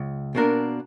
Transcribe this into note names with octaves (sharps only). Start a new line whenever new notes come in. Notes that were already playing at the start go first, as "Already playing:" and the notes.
Already playing: C#2
B2 A#3 D4 A#4